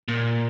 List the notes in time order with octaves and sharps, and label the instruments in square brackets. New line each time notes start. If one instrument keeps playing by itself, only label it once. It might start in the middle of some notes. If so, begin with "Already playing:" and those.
[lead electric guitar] A#2